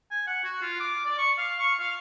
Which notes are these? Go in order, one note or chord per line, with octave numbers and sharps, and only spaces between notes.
G#5
F#5
F#4
F4
D6
D5
C#6
F5
C#6
F5